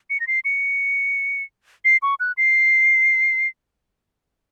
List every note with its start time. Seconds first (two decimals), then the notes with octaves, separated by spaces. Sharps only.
0.10 C#7
0.20 A#6
0.27 C7
0.45 C#7
1.85 C7
2.02 C#6
2.20 F#6
2.37 C7